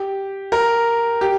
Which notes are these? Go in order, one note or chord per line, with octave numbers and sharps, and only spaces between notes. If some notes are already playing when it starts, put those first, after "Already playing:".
Already playing: G4
A#4
G4